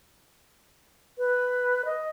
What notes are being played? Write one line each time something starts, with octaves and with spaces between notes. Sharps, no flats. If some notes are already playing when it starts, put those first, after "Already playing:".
B4
D#5